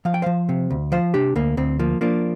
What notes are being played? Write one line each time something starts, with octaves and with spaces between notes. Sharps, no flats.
F3 F5
G5
F3 C5 F5
C3
D2
F3 C5 F5
C3 D4 G4
D2 A#3
D2 C4
F3 A#3
F3 A#3 D4